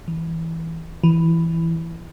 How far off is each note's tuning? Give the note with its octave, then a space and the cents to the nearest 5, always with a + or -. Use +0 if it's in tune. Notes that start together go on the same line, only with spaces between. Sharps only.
E3 -10
E3 +5